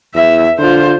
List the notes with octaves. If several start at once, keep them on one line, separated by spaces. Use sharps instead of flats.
E2 E5
D3 F4 C5